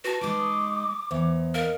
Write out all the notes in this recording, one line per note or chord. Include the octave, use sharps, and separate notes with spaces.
F#4 B4 A5
G#3 D#4 D6 D7
C#6 D#6
E2 C5 E5
A#4 D#5 F5 F6